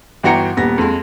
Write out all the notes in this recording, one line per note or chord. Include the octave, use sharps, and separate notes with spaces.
G1 E3 F#4 G5 A#5 C#7
D#1 B3 A#6
F2 G#3